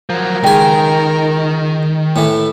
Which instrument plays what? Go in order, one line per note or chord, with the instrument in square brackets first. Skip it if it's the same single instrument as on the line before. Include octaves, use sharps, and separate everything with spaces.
[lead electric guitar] F3 F#3 [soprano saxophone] A#4
[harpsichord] C#2 G#5 [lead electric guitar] D#3 [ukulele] G4 D#5 G5
[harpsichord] A2 E3